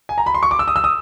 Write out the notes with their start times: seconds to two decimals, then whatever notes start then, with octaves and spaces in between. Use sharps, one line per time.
0.09 G#5
0.18 A#5
0.26 B5
0.34 C6
0.43 C#6
0.51 D6
0.59 E6
0.68 D#6
0.76 E6
0.84 D#6